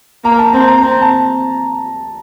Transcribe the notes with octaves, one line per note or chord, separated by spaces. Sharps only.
A#3 A#5
A5
C4 A#5
A#5
C4 A#5
A5